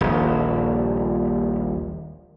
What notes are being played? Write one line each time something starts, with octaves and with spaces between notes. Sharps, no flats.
D#1 A#1